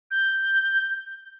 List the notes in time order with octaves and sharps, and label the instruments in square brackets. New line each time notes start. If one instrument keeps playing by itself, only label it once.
[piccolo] G6